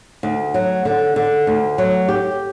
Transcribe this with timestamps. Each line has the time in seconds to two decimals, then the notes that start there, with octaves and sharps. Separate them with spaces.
0.23 D2
0.54 F#3
0.85 D3
1.16 D3
1.47 D2
1.78 F#3
2.09 G4